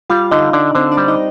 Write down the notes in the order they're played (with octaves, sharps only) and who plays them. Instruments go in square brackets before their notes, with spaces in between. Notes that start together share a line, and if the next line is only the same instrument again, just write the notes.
[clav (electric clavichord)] G3 [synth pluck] F4 F5
[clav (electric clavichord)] D3 [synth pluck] D#4 D#5
[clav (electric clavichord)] D3 [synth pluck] D4 D5
[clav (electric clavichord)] D3 [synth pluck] C4 C5
[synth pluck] D4 D5
[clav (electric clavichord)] G3
[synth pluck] D#4 D#5